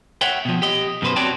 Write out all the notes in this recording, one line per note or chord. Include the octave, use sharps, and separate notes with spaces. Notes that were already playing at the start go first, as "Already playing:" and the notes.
C#5 E5 F#5 G5
B2 F3
G4 D#5
F#2 B2 B4 C5
C4 F#4 C#5 D5 G5 A5